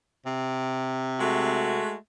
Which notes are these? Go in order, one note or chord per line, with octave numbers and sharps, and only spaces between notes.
C3
G#3 A3 F#4